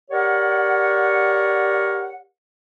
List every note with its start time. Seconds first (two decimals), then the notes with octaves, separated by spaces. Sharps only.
0.11 G4 A#4 C#5 D5 F#5